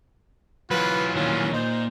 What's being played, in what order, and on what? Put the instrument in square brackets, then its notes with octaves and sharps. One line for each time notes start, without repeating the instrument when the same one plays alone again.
[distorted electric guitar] E3 F#3 [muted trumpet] F4 [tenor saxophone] B4
[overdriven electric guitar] A#2 D#3 [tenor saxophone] C#4 [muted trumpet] F4
[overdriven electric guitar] A#2 [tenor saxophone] D#4 [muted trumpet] C5